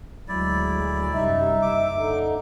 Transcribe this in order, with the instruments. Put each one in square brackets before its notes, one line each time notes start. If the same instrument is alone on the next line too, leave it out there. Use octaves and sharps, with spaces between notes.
[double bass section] D2 F#3 G#3 [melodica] E4 D5
[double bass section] F#2 C3 G3 [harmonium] D#4 [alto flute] E5
[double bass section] F#1 [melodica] D6
[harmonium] D3 D#4